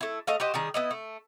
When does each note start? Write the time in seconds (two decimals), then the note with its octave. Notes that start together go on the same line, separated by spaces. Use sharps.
0.01 A3 E4
0.27 A3 D#5 F5
0.40 F#4 G4 C5 D#5
0.54 D#3 G3 G#4
0.74 B3 E4 D#5
0.91 A3